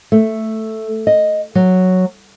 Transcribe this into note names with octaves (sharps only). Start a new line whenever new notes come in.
A3
D#5
F#3